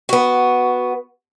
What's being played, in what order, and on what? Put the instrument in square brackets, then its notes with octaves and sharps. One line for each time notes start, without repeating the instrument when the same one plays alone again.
[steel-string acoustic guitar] B3 F#4